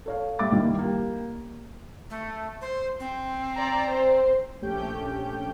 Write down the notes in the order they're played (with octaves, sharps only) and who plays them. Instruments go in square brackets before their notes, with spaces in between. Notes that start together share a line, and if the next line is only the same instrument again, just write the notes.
[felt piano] A4 C#5 F5
G3 E5 D6 A6
C2 G2 D#3 G3 A#3 E4
A#3 G4
[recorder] A3
C5
C4
[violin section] D5 A#5
C5
[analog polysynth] A#1 A3 C#4 G4 G5 G6